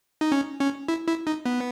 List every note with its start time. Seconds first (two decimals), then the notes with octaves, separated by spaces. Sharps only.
0.21 D#4
0.32 C#4
0.60 C#4
0.88 E4
1.08 E4
1.27 D#4
1.46 B3